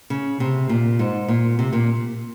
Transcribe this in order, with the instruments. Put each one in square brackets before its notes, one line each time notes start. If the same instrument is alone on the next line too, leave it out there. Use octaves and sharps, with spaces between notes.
[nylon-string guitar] C#3
C3
A#2
G#2
A#2
C3
A#2